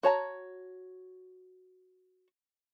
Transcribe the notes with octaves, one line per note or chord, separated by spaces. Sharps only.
F#4 C#5 A5 A#5